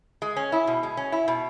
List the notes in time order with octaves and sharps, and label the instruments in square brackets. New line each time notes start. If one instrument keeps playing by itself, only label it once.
[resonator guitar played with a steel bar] G#3
C#4
E4
B2
G#3
C#4
E4
B2